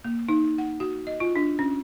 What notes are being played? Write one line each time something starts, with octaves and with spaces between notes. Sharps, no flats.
A#3
D#4
F#5
F#4
D#5
F4
D4
C#4